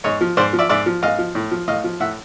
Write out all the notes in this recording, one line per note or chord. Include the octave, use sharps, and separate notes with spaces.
G#2 C#5 D#5
F3
G#2 C5 D5
F3
D5 E5
G#2 D5 E5
F3
G#2 D#5 F5
F3
A2
F3
A2 D#5 F5
F3
A2 E5 F#5